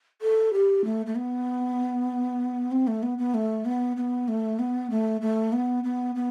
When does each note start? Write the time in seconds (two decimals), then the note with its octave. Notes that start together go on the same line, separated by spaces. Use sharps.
0.22 A4
0.53 G4
0.85 A3
1.06 A3
1.15 B3
2.72 C4
2.87 A3
3.03 B3
3.18 B3
3.34 A3
3.65 B3
3.97 B3
4.28 A3
4.59 B3
4.90 A3
5.21 A3
5.53 B3
5.84 B3
6.15 B3